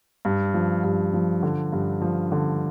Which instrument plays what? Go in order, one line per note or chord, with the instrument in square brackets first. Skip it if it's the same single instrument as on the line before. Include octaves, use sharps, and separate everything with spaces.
[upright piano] G2
F3
G2
F3
D3
G2
F3
D3